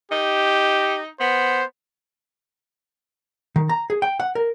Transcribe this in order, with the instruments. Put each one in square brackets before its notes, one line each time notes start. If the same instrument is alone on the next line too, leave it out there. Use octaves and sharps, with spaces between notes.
[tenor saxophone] D#4 [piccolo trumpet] G4
[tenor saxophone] B3 [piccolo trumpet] C5
[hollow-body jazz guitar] D#3
A#5
G#4
G5
F#5
A#4